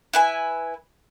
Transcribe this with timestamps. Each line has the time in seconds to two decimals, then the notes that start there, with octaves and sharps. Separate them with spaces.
0.13 E4 B4 G#5